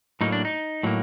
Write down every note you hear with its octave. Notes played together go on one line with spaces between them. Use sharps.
A2 F#3 A#3 D#4
D4
D#4
A2 F#3 A#3